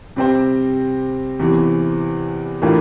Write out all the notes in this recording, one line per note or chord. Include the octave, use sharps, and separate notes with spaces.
C3 G3 C4 G4 C5
E2 C3 E3
A2 E3 A#3 D4 F4